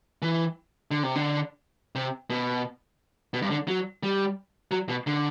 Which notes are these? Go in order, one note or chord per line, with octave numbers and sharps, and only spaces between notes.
E3
D3
C3
D3
C3
B2
B2
G2
D3
F#3
G3
F#3
B2
D3